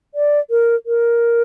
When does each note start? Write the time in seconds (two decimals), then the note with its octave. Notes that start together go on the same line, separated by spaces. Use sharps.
0.15 D5
0.50 A#4
0.86 A#4